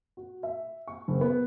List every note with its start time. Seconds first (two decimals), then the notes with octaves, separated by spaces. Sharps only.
0.17 F#4
0.43 E5
0.88 C#6
1.08 F#1
1.21 B3